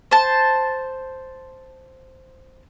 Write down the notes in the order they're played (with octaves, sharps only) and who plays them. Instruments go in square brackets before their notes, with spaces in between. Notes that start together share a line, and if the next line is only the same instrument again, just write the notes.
[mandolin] C5 A5